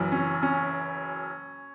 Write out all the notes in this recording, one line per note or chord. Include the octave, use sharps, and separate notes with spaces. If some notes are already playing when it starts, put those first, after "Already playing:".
Already playing: F#1 F#2 E3
C#4
C#4